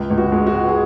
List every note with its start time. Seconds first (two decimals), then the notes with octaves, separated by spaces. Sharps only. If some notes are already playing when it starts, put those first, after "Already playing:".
Already playing: C#2
0.10 C#2
0.18 F#4
0.32 G#3
0.47 F#4
0.54 C#2
0.69 G#4